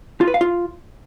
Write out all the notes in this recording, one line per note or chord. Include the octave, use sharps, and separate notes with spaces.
F4
B4
F5
F4